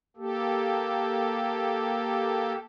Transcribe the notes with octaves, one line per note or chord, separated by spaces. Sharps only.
A#3 G4 A4